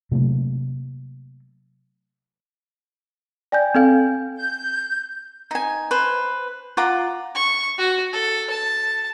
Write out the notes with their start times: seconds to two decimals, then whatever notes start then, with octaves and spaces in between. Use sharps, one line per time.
0.12 C3 F#3 A3 A#3
3.52 D5 G5 G#5 G6
3.75 C4 A4 F5
4.36 G6
5.51 D#4 G#5
5.91 B4 C5
6.77 F4 F#5 A#5 D6
7.35 C#6
7.78 F#4
8.12 A4
8.50 A5